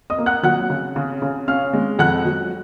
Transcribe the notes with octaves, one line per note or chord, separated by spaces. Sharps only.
D#5 D#6
A#3
F#5 F#6
F#3 F#5 F#6
C#3
C#3
C#3
C#4 F5 F6
G#3
F2 F#5 F#6
F#3